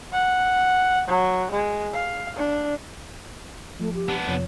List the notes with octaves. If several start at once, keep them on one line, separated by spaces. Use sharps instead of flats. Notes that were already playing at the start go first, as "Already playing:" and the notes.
F#5
F#3
G#3
F5
D4
F3 A3
G4
B3 D4
F2 C3 F3 C#5